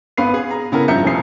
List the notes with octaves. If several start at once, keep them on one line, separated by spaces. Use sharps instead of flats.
G#1 B3 B4 F5 C7
G#4
A#5
C#3 B3 E4 A#4
G2 F3 E5 A#5 G6 C#7
F1 F2 F3 C7